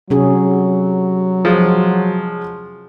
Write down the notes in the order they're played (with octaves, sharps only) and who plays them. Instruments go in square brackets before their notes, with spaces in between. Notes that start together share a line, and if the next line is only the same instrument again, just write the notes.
[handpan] C3 C#4 G#4 [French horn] F#3
[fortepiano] F3 G#3